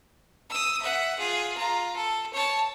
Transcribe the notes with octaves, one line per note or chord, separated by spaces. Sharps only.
D#6 E6
E5 F#5
F4 G#4
F4 A#5
A4
C#5 A5